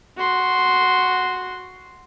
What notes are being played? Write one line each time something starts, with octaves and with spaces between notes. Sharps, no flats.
F#4 C6